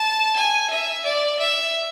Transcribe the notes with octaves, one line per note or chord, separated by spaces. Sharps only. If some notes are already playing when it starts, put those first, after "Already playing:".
Already playing: A5
G#5
E5
D5
E5